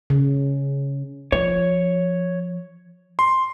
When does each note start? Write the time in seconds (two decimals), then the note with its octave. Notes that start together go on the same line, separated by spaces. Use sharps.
0.10 C#3
1.32 F3 C#5
3.19 C6